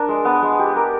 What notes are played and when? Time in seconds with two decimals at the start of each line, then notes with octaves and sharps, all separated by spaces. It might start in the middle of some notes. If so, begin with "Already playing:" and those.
Already playing: D4 A#4
0.09 G#3
0.25 B3
0.42 G#3
0.59 G4
0.76 A#4